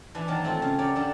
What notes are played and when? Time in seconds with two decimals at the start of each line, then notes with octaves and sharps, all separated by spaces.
0.15 E3 D4 E4 G#5 B5
0.28 D#3 E3 F#3 A#3 G#4 A5
0.44 A3 C4 E4 F4
0.62 C#3 F4 G#4
0.79 F#3 G4 A#4 C#5 D5
0.95 D3 C#4 D4 A4